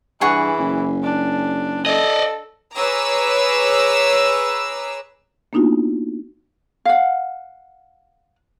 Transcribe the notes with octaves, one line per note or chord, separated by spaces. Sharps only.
G2 E3 G#4 F#5 C#6
F#1
D4
A4 D5 D#5
G#4 B4 C#5 A#5 D6 E6
A#3 B3 D4 D#4 F4 F#4
F5 F#5